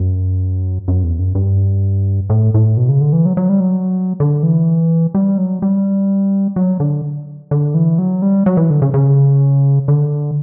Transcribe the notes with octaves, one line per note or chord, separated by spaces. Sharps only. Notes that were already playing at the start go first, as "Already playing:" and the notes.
Already playing: F#2
F#2
E2
F#2
G2
A2
A2
B2
C#3
D3
E3
F#3
F#3
G3
F#3
D3
E3
G3
F#3
G3
F#3
D3
D3
E3
F#3
G3
F#3
E3
D3
C#3
C#3
D3